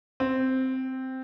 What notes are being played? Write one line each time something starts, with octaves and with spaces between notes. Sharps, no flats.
C4